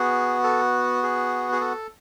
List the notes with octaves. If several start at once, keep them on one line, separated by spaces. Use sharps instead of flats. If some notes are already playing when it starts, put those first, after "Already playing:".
Already playing: B3 F#4 G#4
A4
G#4
G#4
A4